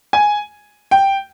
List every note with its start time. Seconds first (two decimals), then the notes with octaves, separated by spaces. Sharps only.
0.13 G#5
0.91 G5